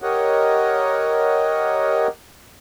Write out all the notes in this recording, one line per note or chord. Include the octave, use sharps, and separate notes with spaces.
G4 A#4 C#5 D#5 F#5